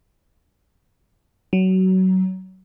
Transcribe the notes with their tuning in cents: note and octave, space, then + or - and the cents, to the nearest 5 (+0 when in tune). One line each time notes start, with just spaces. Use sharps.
F#3 +20